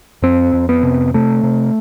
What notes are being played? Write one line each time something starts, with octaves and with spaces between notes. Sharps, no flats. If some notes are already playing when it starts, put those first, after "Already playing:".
F2 C4
F2
B3
C3
C3 A3
C3